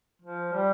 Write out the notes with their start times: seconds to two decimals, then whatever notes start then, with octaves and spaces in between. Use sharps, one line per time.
0.22 F3
0.53 G3